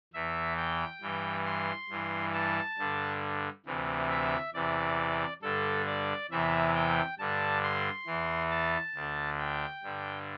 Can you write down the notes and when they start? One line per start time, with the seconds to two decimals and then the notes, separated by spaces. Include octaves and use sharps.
0.14 E2 E3 E5
0.57 G5
1.01 G2 E3
1.46 C6
1.89 G2 E3
2.34 A5
2.78 G2 D3
3.66 D2 C3 E3
4.10 E5
4.54 E2 C3 E3 D5
5.42 G2 D3 A4
5.87 D5
6.31 E2 C3 E3 E5
6.75 G5
7.19 G2 D3 A5
7.63 C6
8.07 E2 E3
8.51 A5
8.95 D2 D3
9.39 G5
9.83 G2 D3